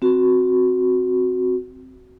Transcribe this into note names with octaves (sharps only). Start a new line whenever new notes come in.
C4 F#4